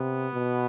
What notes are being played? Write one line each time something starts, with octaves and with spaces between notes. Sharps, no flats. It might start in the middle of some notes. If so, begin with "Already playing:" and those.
Already playing: C3 B3
B2